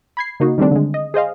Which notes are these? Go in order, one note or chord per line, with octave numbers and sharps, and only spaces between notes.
B5 G#6 C7
C#3 A#3 D#4 F#4
D#3 G3 A3 C4 D4
D3 G#3
D#5
G#4 C5 D#5 F5